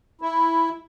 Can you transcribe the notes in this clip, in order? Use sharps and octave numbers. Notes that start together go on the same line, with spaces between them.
E4